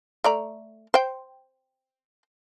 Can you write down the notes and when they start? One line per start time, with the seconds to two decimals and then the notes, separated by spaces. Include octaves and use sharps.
0.24 A3 D5 A#5
0.94 C5 G5